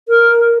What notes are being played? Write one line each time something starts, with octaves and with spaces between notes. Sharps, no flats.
A#4